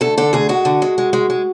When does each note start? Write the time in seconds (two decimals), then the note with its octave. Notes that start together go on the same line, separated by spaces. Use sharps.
0.01 D2 A4
0.18 D3 A4
0.33 D2 G#4
0.49 G#3 F#4
0.65 D3
0.82 G#3
0.98 G#3
1.13 G#3
1.30 G#3